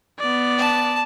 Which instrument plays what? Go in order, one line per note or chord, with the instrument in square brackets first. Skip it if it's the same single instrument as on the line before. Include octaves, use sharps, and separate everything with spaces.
[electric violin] B3 D5
[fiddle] A5